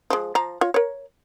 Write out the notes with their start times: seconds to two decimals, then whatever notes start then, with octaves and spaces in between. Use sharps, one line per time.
0.10 F3 G#3
0.35 F3 A#5
0.61 F4 C#5
0.74 A#4 C#5